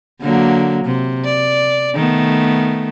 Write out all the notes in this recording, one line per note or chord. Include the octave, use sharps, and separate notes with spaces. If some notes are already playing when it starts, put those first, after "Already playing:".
D3 F#3 A#3
C3
D5
D#3 A3 B3